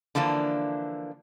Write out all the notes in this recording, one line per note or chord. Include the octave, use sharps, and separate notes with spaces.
D3 E3 F3 A#3 D4